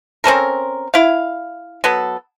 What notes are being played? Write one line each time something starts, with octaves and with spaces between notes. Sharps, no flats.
C4 C#4 A4 A#4
E4 F5
F#3 B3 A4